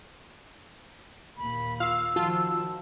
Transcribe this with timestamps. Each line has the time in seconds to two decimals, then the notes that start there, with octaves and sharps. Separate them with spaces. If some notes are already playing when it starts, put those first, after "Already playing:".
1.37 D#2 A#2 A#3 B5
1.80 F4 F5 E6
2.16 D#3 F3 F4 F#4 A5